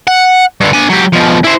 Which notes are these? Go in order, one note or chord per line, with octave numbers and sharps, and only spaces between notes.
F#5
G2 D3
D4 G#5
F#3 G4
B2 F3
E4 C5